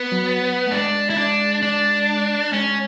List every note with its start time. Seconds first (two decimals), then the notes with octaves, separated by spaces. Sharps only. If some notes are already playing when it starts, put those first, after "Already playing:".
Already playing: B3
0.12 F#3
0.67 A3
0.71 G#3 D4
1.10 E4
1.17 D4
1.63 D4
2.53 G#3 C#4